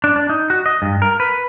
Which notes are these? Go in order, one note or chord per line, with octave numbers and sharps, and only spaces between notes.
D4
D4
D#4
F#4
D#5
G2
A#4
B4